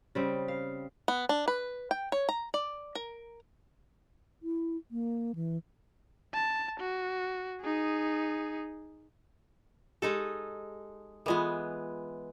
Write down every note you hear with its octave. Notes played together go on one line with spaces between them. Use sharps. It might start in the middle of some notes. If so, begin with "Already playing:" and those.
C#3 G3 C4
F5
B3
D4
B4
G5
C#5
A#5
D5
A#4
E4
A#3
E3
A5
F#4
D#4 G#4
G#3 D#4 G4 A4
E3 G#3 B3 F4 A4